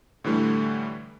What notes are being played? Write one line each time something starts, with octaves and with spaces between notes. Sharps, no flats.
A2 D3 E3 G3 A3